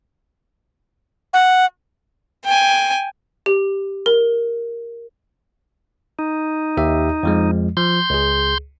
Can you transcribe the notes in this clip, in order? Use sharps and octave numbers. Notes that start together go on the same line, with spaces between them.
F#5
G5 G#5
G4
A#4
D#4
D#2 G4 E5
F2 F3 G#3
F3 C6 G6
C#2 G#4